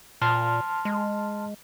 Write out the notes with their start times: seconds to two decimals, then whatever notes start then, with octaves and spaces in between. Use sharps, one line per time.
0.22 A#2 A5 C6 F6
0.85 G#3